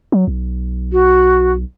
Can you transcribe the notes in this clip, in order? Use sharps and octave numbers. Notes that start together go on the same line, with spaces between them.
F#3
B1
F#4